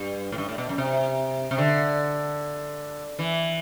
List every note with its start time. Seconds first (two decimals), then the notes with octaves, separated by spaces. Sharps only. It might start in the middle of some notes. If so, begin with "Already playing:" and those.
Already playing: G2
0.32 A2
0.38 G2
0.49 A2
0.58 B2
0.69 F#2
0.78 C3
1.51 C3
1.58 D3
3.19 E3